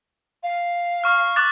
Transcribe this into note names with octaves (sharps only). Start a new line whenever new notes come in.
F5
C#6 F6
D6 F#6 A6